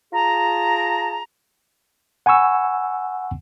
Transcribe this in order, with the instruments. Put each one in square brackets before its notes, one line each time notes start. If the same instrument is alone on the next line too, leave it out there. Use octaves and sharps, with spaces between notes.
[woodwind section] F4 G#4 A5 A#5
[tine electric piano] F#5 G#5 B5 C#6 E6